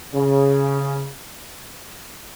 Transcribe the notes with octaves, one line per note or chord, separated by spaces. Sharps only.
C#3